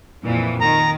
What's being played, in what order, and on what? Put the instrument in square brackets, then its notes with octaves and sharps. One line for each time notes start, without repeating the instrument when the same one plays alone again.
[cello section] F2 A#2 E3
[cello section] D#3 [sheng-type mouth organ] A#5